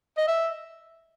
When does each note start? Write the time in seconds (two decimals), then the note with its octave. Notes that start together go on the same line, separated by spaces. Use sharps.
0.17 D#5
0.28 E5